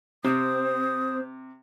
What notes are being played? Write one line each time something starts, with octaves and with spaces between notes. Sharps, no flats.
C3 C4 C5 D#6